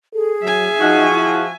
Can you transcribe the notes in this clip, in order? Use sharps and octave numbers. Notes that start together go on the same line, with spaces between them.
G#4 A4
F#3 E5 G#5
F3 D#4 F#4
E4